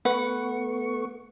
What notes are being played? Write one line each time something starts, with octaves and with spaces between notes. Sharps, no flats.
A3 B3 B4 F#5 C#6